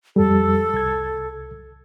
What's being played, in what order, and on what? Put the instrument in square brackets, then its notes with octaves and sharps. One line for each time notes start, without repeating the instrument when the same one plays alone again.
[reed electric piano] F2 G3 [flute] A4
[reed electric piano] C2 G#6